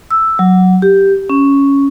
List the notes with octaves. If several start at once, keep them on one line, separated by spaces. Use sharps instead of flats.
E6
F#3
G4
C#4